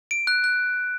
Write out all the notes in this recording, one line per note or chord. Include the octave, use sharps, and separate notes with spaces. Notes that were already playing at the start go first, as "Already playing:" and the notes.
D7
F#6
F#6